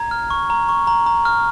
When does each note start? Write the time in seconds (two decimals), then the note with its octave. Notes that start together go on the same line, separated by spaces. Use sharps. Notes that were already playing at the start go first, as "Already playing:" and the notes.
Already playing: A#5 G#6
0.11 F6
0.30 C#6
0.50 A#5
0.69 C#6
0.87 A#5
1.06 A#5
1.25 F6